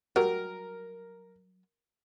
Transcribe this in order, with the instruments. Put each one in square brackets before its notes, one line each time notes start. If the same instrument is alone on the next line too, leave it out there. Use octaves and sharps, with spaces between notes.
[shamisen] F#3 G3 [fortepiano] A#4